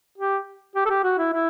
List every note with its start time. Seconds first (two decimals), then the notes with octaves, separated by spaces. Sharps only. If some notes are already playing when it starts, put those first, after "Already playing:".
0.18 G4
0.76 G4
0.86 A4
0.89 G4
1.04 F#4
1.18 E4
1.33 E4